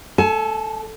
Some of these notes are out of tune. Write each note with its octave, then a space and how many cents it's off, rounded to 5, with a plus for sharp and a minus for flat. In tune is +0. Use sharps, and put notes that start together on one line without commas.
A4 +0 G#5 +35